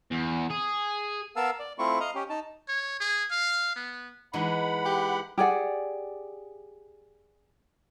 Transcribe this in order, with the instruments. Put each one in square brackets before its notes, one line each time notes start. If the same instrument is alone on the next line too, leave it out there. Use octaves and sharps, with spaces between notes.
[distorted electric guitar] E2
G#4
[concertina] B3 A#4 F5 A5 E6
D5
A3 C4 E4 F4 C#6
D#5 F5 A#5
C#4 G4
D#4 A5
[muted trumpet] C#5
G#4
F5
B3
[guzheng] E3 G#3 D#4 [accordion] F#5 B5
[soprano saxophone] G4
[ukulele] G4 G#4 D5 F#5